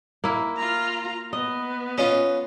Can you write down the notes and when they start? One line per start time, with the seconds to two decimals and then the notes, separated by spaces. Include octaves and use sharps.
0.24 A#3 E4
0.57 F4 A#5
1.33 B3 D#5
1.98 C#4 F4 D#5